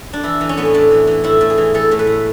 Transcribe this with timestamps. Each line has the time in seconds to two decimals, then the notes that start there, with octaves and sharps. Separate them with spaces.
0.13 D4
0.23 E3 E4
0.41 E3
0.49 C#4
0.57 A2 B3
0.65 C#4
0.74 A2 D4
0.91 E3
1.07 E3
1.24 A2 E4
1.41 A2
1.50 G#4
1.58 E3
1.74 E3 A4
1.91 A2
1.99 B4
2.07 A2